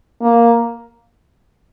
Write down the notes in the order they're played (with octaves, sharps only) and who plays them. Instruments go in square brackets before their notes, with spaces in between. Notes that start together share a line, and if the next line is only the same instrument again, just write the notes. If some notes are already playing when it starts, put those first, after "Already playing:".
[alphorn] A#3